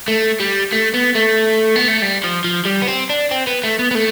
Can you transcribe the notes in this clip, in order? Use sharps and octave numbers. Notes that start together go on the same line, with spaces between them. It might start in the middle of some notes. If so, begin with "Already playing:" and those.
A3
G3
A3
B3
A3
B3
A3
G3
F3
F3
G3
B3
C4
D4
C4
B3
A3
B3
B3
A3